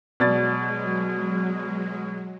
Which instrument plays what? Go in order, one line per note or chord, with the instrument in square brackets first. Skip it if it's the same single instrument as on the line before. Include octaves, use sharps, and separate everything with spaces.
[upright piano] B2 D5 A6 [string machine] F#3 G#3